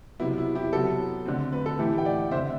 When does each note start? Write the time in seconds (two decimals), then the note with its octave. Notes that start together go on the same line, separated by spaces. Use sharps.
0.20 C3 F#3 B3 E4
0.38 E4
0.55 E4 G4
0.73 C3 F#3 B3 F#4 A4
1.26 D3 A3 C4
1.53 B4
1.66 A4
1.79 A2 E3 A3 E4 G4
1.98 G5
2.05 D5 F#5
2.31 D3 A3 C4 C5 E5